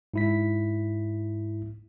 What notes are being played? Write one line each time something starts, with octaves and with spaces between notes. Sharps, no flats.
G#2 E4 B6